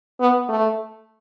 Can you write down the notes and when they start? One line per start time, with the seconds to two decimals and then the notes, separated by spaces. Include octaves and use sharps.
0.20 B3
0.49 A3